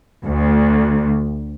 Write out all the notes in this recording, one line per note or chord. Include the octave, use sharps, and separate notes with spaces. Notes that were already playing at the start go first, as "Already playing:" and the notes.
D2